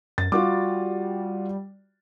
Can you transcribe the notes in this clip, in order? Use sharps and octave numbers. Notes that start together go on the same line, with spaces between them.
F#2 A6
G3 F4 F#4 D6